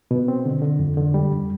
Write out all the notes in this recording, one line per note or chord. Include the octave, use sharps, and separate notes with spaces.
B2
C4
D3
D3
F2
D3
G3
F2